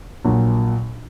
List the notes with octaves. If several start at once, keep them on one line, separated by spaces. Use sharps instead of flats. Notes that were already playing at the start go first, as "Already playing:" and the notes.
A#1 A#2 F#3